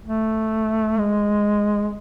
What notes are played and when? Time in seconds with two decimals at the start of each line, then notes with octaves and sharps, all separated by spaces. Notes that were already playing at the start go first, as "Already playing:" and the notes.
0.04 A3
0.98 G#3